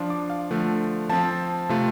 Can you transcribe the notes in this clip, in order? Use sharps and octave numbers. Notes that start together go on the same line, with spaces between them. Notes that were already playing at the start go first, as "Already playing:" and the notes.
Already playing: F3 D4 F4
D6
F5
D3 F3 A3
F3 C4 F4 A5
C3 A3 F4